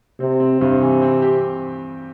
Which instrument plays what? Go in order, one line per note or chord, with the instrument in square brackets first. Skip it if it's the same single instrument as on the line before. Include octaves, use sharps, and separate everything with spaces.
[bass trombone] C3 [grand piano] C4
[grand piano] C4
[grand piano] G2 [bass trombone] C3
[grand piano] E3
C4
G4